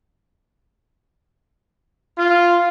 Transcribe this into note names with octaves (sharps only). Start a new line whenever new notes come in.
F4